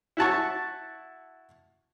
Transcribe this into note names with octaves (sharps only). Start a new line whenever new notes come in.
E4 F#4 A5 C#6